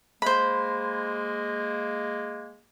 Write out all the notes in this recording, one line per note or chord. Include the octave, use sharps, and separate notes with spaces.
G#3 A#3 C5 B5